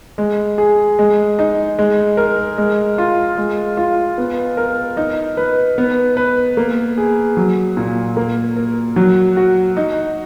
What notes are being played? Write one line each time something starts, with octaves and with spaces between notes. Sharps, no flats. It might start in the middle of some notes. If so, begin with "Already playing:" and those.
G#3
G#4
G#3
D#4
G#3
A#4
G#3
F4
G#3
F4
B3
A#4
D#4
B4
B3
B4
A#3
G#4
F#3
A#2
A#3
A#4
F#3
F#4
D#4